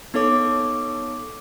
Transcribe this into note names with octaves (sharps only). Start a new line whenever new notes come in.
B3 D#4 A4 C#5 D6